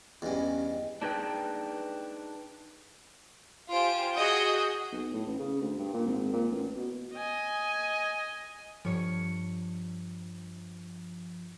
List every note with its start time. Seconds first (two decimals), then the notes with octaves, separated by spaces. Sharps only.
0.22 E2 G2 C#4 D#5
1.02 D4 D#4 G#4 B4 G5
3.71 F4 G4 C5 G#5 D7
4.15 F#4 G#4 D#5 F#5 D#6 G6
4.92 B1
5.13 A2
5.27 A1
5.39 C#3
5.61 D2
5.78 G2
5.93 A#2
6.06 G#1
6.33 A#2
6.51 A1
6.77 B2
7.13 D#5 G#5
8.85 G2 F3 C#5 C#7